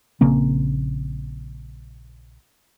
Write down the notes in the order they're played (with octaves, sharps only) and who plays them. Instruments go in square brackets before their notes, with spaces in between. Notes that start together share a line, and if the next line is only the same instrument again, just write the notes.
[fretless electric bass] A#1 C#3 A#3 C4